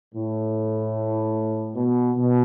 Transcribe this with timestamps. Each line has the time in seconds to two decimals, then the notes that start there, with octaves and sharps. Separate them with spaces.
0.13 A2
1.75 B2
2.15 B2